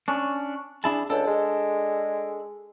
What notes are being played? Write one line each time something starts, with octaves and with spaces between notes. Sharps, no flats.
C#4 D4
D4 E4 G#4 A5
C#2 D4 A4
G#3